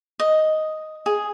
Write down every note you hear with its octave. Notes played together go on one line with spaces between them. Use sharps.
D#5
G#4